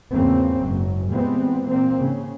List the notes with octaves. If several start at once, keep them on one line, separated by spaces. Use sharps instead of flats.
E2 G#2 C#3 F3 A#3 C4
F#1 G#2 F#3
A#2 E3 G3 G#3 B3 C4
A#2 A#3 C4
G#2 C#3